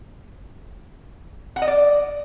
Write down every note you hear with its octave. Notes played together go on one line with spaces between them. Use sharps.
F#5
D#5
D5